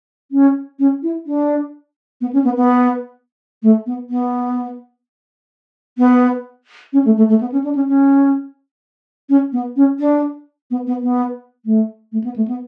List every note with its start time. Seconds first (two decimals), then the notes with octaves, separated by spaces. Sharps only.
0.31 C#4
0.79 C#4
1.02 E4
1.26 D4
2.21 B3
2.33 C#4
2.44 B3
2.57 B3
3.62 A3
3.86 B3
4.10 B3
5.98 B3
6.93 C#4
7.05 A3
7.17 A3
7.29 A3
7.41 B3
7.52 C#4
7.64 D4
7.75 C#4
7.87 C#4
9.29 C#4
9.52 B3
9.76 C#4
10.00 D4
10.71 B3
10.87 B3
11.03 B3
11.65 A3
12.12 A3
12.24 B3
12.36 A3
12.48 B3